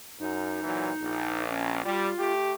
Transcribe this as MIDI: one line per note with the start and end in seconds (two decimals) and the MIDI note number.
0.19 0.61 42
0.19 1.44 63
0.63 0.89 46
0.63 0.89 52
0.63 0.89 54
1.02 1.81 34
1.50 1.82 61
1.85 2.10 55
1.85 2.33 65
2.18 2.53 57
2.18 2.53 67